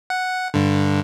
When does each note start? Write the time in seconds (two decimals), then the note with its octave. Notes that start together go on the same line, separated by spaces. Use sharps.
0.10 F#5
0.54 G2 D3